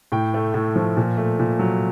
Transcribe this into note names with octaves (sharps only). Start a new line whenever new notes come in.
A2 G5
A3
A2
F3
A#2
A3
A#2
F#3